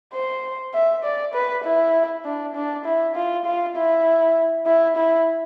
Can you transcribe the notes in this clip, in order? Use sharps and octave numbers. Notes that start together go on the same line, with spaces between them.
C5
E5
D5
B4
E4
D4
D4
E4
F4
F4
E4
E4
E4